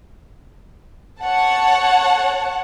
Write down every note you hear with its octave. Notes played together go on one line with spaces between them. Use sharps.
C#5 F#5 A5